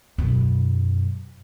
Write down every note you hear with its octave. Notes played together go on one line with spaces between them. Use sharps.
F#2 B2